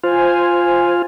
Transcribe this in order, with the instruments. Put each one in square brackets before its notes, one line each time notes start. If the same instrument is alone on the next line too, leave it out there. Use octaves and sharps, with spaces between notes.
[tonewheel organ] F4 [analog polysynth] C5 G#5